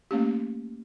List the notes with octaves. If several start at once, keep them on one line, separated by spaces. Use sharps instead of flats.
A3 A#3 C#4 G4